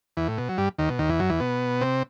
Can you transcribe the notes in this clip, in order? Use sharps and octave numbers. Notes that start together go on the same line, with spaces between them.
E2 E3
A2
B2
F#3
G2 G3
D#2 D#3
B2
D#2 D#3
E2 E3
F#2 F#3
E2 E3
B2 B3
C3 C4